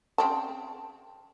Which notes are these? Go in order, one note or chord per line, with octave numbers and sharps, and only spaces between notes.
C#3 C4 A5